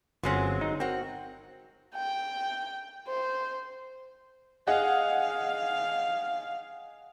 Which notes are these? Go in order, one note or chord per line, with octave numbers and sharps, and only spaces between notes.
G1 F#3 G#3 C4 C#4
D#4
C4 F#4 A#4
G5
C5
G#4 D#5 F5 F#5